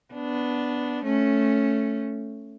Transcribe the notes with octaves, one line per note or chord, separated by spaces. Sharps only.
B3 D4
A3 C#4